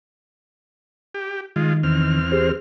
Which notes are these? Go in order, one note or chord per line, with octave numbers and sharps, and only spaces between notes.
G4
D#3 G#3 F4
E2 C4 F6
G4 G#4 C5